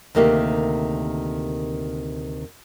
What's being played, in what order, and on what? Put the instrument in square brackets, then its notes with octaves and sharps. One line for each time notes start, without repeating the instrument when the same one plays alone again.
[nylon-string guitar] D2 C3 D#3 A#3 G4 E5